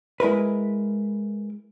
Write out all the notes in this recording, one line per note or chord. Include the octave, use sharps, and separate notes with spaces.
G#3 E4 A#4 B4